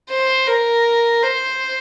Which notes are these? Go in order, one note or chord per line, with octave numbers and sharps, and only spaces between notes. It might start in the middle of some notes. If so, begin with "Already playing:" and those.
C5
A#4
C5